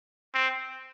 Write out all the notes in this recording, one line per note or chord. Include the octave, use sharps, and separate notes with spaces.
C4